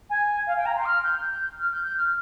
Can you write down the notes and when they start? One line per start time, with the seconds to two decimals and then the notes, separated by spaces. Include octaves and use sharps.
0.09 G#5
0.47 F5
0.57 G5
0.65 A#5
0.76 C6
0.85 F6
1.04 G6
1.21 G6
1.59 F6
1.72 G6
1.84 G6
1.97 F6